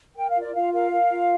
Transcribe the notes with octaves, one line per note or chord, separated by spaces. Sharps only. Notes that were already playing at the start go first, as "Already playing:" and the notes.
A#4 G5
F5
F4
D5
F4 F5
A#4 F5
A#4
F4